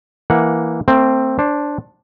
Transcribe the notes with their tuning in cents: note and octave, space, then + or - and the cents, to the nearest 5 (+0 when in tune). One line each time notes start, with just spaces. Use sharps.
E3 +0 A#3 +0 F#5 -15
A3 +40 C4 +0
D4 -5 C5 +20